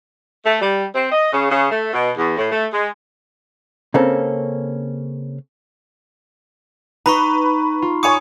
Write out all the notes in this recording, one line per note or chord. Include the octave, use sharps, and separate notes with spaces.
A3
G3
C4
D#5
C#3
C#3
A3
B2
E2
A2
A3
G#3
C#3 A#3 C4 C#4 A4
D#4 B4 A#5 B5 C#6
F4
C#5 G#5 C#6 D#6 C#7